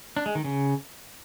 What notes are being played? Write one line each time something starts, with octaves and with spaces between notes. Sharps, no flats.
D4
G#3
D#3
C#3